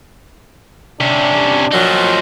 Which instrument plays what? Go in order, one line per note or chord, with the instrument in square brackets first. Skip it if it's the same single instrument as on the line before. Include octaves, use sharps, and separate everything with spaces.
[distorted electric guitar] C3 C#4 [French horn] D4
[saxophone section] A#2 F#3 [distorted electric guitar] F3 D#4